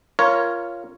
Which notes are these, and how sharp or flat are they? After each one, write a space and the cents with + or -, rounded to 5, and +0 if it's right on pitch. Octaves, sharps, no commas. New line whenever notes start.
F4 -15 A#4 +5 C#5 +0